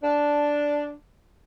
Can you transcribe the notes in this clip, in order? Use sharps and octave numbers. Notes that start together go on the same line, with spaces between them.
D4